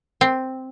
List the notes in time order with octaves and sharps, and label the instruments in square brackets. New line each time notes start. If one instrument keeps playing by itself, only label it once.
[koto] C4